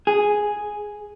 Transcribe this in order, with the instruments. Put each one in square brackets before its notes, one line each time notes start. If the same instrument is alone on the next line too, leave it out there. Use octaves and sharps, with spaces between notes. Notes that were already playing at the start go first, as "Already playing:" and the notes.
[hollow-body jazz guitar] G#4